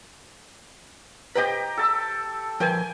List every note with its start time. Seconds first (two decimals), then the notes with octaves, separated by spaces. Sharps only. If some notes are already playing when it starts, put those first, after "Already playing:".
1.35 G4 B4 C5 D#5 G5 A#5
1.77 A4 A5 E6
2.60 F3 A#4 B4 G5 G#5